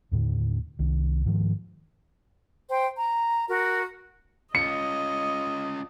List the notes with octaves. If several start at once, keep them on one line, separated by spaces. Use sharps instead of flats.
D#2 A2 D3
C2 D#3
G#2 D#3 F3
C5 G5
A#5
F#4 A#4
C#4 F4 D#5 C#7